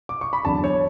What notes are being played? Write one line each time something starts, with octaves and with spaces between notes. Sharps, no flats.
D6
C#6
B5
E2 D3 F#3 A5
C#5